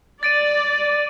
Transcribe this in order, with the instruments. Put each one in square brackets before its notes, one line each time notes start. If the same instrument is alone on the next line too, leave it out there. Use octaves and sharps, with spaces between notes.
[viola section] D5 [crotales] A6 D7 D#7